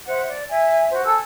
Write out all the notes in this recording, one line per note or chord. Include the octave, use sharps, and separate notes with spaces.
C5 E5 F#5
D5
E5 G#5
F#4 C5
A4 G#5 E6